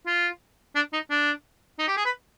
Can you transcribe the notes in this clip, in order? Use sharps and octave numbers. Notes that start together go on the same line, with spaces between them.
F4
D4
D#4
D4
D#4
G4
G#4
B4